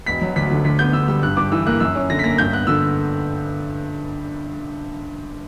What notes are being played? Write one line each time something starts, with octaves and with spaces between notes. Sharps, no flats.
E1 B6
F#3
D2 B6
D3
D2 B6
B3 G6
D3 E6
G3 E6
G2 F#6
G2 D6
E3 E6
A#3 F#6
F#2 E6
C#4
D3 A#6
B6
A#3 A#6
G2 G6
B3 F#6
D3 E6